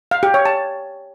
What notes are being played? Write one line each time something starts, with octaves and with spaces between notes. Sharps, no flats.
F5
G4
C#5
A5